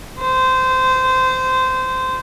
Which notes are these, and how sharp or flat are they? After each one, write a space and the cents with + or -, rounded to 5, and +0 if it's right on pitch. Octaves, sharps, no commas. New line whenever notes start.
C5 -20